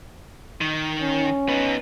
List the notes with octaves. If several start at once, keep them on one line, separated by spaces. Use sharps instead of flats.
D#3
C#4
B3 D#4